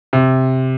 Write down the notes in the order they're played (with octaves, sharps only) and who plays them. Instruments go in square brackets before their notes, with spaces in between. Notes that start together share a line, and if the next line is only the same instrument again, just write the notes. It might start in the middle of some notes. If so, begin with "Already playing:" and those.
[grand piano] C3